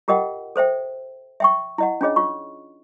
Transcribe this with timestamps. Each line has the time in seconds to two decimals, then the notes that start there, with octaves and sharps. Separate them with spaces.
0.08 F4 G4 A#4 D#5 F#5 G5
0.56 A4 C5 E5 G5
1.40 E5 G5 C#6
1.78 E4 D#5 F#5
2.01 C#4 D4 F4 G#4 C#5 D#5
2.16 F4 C#6